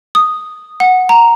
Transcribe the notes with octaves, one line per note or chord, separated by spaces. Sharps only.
D#6
F#5
A#5